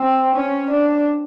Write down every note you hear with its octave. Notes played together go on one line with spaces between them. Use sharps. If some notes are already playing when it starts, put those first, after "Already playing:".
Already playing: C4
C#4
D4